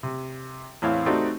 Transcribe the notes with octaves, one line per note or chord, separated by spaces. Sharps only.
C3
E2 A2 C4 C5 C#5 F5
A3 C4 D#4 F#4 G4 D5